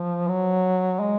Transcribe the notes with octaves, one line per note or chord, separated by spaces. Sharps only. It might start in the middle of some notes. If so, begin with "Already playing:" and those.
Already playing: F3
F#3
G#3